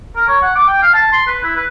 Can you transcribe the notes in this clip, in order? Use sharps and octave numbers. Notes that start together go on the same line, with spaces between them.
A#4
C#5
F#5
D6
G5
F5
A5
C6
B4
E4
B4